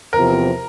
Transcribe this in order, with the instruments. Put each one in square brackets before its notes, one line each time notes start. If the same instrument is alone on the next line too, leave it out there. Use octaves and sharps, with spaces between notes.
[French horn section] E2 C3 F3 [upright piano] A#4